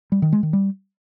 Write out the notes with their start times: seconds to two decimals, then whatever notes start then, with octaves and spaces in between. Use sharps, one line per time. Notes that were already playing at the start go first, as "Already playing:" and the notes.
0.12 G3
0.22 D#3
0.33 G#3
0.43 D#3
0.53 G3